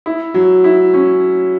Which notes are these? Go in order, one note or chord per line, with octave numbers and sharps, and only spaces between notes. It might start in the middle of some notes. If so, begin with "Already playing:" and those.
E4
F#3
E4
C#4